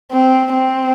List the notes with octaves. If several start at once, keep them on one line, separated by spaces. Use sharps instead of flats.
C4
C4